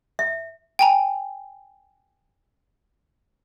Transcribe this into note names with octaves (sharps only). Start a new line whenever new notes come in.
E5
G5 G#5 A#5